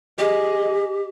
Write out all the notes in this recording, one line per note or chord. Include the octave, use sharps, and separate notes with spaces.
G4 G#4 D#5